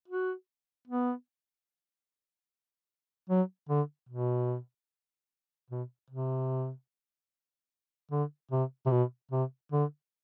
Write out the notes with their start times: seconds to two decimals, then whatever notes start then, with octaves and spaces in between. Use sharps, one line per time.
0.08 F#4
0.87 B3
3.30 F#3
3.69 D3
4.09 B2
5.70 B2
6.10 C3
8.11 D3
8.51 C3
8.86 C3
8.91 B2
9.31 C3
9.72 D3